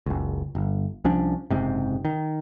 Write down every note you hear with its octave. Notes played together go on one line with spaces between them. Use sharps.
F#1 C#2
G1
C2 F3 C#4 D4
F#1 G#2 C3
D#3